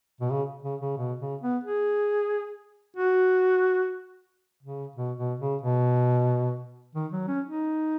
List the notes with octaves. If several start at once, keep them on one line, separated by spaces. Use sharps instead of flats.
B2
C#3
C#3
C#3
B2
C#3
B3
G#4
F#4
C#3
B2
B2
C#3
B2
D#3
F#3
C#4
D#4